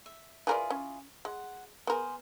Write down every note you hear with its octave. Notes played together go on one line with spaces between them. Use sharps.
E5
E3 E4 F4 G#4 A#4 D5
C#4
G#3 F#5
B3 G#4 A#4 C5